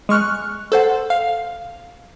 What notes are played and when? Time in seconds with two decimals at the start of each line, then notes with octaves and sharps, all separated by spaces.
0.09 G#3 C#6 F6 F#6
0.72 A4 C5 F#5
1.10 F5